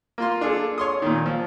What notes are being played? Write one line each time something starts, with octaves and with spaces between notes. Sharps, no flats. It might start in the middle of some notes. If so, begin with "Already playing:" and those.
A#3 F4 C6
D4 F4 G#4 A4
C#5 C6 D#6
A#2 D#3
F3